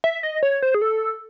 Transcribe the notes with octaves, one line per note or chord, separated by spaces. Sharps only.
E5
D#5
C#5
C5
G#4
A4